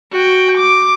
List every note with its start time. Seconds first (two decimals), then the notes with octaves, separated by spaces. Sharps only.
0.12 F#4 G5
0.57 D6